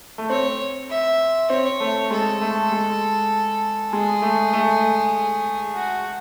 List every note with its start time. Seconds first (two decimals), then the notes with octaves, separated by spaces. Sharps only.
0.18 A3
0.30 C4 C#5
0.89 E5
1.50 C4 C#5
1.80 A3
2.11 G#3 A4
2.41 A3
2.72 G#3
3.92 G#3 G#4
4.22 A3
4.53 A3
5.75 F#4